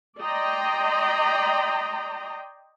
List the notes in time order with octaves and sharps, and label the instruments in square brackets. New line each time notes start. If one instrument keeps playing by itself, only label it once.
[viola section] D5 D#5 G5 A#5 C6